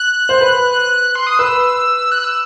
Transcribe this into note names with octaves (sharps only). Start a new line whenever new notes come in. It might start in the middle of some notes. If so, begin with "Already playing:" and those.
Already playing: F#6
C5
B4
C6
D#6
B4 E6
F#6
E6